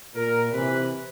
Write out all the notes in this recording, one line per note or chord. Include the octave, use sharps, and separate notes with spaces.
A#2 A#4
C3 E3 B4